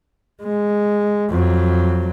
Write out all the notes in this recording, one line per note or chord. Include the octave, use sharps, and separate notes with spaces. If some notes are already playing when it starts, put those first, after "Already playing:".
G#3
F2 F#3